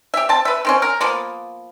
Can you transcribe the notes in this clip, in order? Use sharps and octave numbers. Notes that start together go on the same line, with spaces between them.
G4 E5
C4 A5
B4 E5
D#3 C4 C#4
A#4
F3 A#3 B3